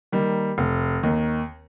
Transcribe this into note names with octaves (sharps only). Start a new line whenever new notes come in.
D#3 G3 A#3
F1
D#2 D#3